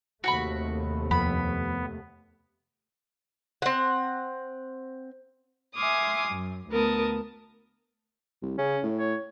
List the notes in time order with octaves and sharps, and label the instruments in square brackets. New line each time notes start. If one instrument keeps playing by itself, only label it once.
[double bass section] D#2 C3 A3 [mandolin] F#4 F#5 B5
[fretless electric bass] F2 [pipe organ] B3 [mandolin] B5
[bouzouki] C4 F#5
[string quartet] E5 G#5 C6 D6 D#6 F6
F#2
D2 B3 A#4 A5 D#6
[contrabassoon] C2
[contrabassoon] C#3 [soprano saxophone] C#4
[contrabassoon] A2
[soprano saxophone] C#5